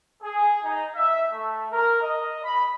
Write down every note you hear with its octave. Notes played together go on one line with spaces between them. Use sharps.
G#4
D#4
E5
A3
A#4
D#5
B5